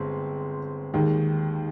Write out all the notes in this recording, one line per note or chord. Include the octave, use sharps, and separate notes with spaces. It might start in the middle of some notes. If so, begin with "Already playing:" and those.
Already playing: G1 G#3 C4
D#2 D#3 G#3